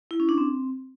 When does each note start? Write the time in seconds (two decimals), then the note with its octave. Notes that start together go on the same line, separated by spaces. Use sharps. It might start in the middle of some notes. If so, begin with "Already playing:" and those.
0.11 E4
0.20 C#4
0.29 D4
0.38 C4